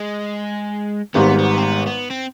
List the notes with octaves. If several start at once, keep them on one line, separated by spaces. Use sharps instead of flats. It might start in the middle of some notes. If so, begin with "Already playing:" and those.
Already playing: G#3
G#1 G#2 G3 B3
B3
C4
B3
B3
C4